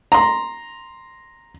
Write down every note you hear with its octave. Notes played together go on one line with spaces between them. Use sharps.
A#5 C6